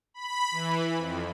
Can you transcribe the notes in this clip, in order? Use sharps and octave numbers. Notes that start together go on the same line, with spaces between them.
B5
E3
F2